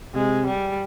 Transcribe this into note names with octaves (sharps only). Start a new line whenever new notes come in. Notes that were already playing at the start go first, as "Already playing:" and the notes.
C3 G#3
G3